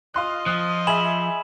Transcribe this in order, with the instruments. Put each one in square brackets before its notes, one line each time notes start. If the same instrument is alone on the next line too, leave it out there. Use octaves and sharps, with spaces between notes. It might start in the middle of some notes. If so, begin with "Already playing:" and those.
[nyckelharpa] F4 D#5 [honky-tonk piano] F5 C6 F#6
[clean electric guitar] F3 [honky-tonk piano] D#6 F#6
[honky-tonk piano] G#4 E5 [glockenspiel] B5 E7 F#7